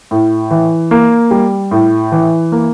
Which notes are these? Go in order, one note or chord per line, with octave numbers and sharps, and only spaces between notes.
A2
E3
A#3
G3
A2
E3
A#3